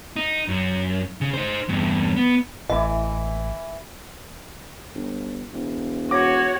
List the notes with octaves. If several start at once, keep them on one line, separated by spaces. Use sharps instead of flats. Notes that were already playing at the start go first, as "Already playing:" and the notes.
D#4
F#2
C#3
D#4 C5
E2 G2
B3
A1 E3 E4 D#5 D6
G1
E1
F#4 C#5 D6 A#6